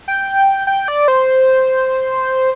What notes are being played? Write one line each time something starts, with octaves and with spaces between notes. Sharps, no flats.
G5
G5
D5
C5